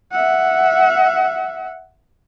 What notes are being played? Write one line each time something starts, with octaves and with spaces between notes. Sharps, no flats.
E5 F#5